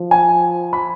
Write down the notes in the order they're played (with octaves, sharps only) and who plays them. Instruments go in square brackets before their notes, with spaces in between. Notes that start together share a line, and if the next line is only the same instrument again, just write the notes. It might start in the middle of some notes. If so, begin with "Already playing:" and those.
Already playing: [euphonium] F3
[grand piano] G#5
B5